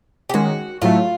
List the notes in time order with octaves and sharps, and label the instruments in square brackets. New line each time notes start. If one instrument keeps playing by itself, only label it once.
[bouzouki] G4
[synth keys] D#3 G#3 C#4 [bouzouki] F#4
[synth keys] A2 F#3 A3 [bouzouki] F4